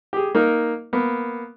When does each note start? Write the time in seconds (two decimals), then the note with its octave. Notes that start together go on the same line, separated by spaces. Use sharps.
0.13 G4 G#4
0.35 A#3 D#4 A#4
0.93 A#3 B3